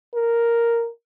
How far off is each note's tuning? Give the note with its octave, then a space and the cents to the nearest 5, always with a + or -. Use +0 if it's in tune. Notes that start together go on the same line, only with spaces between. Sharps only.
A#4 +0